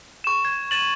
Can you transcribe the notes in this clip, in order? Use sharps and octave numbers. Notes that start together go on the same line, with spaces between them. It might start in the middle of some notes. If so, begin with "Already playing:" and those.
C#6 E7
G#6
A6 D#7 E7 F#7